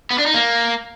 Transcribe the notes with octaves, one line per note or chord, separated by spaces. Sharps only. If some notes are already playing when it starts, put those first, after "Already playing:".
B3
D4
D#4
A#3